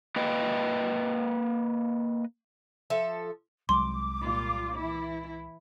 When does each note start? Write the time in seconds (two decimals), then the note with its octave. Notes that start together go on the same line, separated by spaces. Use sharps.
0.16 A#3 B4 D#5 G5
2.90 F3 A4 E5
3.69 C2 F#3 G#3 C6 D6
4.21 A#2 G3 F4
4.77 E3 E4